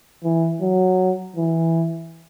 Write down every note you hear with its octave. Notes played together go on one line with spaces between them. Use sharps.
E3
F#3
E3